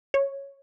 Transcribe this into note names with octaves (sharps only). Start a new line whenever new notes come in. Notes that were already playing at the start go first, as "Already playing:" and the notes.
C#5